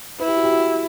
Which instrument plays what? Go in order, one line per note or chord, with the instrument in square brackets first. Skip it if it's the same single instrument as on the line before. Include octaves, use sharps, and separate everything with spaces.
[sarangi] E4 [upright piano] B4
[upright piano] G4
F#4
G4
F#4